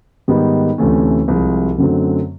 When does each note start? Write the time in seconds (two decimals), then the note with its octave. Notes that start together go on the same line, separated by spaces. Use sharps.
0.28 G#2 D#3 G3 B3 D#4
0.78 D2 C3 E3 A3 C#4
1.28 C2 C3 F3 G#3
1.78 F#2 D3 F#3 A3 C4